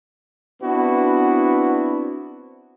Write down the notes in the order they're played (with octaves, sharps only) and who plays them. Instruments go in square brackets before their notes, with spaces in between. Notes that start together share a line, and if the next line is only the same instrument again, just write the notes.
[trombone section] B3 C4 D4 E4 F#4